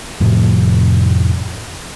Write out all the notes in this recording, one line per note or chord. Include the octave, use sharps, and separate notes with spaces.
F2 A2 C3 F3